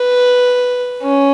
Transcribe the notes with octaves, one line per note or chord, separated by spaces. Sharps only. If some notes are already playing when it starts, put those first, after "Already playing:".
Already playing: B4
C#4